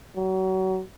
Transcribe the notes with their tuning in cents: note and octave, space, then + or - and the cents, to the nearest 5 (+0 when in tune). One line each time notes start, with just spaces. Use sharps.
F#3 +30